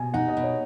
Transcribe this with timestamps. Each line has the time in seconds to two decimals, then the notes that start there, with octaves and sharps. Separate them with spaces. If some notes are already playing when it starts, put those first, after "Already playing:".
Already playing: B2 G#5
0.14 D#4 F#5
0.28 D#5
0.37 B2
0.43 C#5